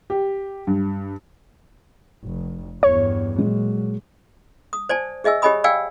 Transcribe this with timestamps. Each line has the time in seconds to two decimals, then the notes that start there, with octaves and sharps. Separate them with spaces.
0.10 G4
0.67 G2
2.24 F1
2.83 E2 G2 C#5
3.38 A#2 F#3 G#3
4.73 D#6
4.89 C5 D5 G#5 A5
5.24 G#4 D#5 E5 G#5 E6
5.42 G4 C#5 D#5 G#5 B5 D#6
5.64 D5 F5 G5 G#5 E6